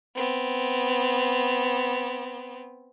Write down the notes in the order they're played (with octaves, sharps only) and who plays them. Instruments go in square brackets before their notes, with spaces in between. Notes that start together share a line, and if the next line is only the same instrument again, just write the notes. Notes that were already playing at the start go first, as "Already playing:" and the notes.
[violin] B3 C4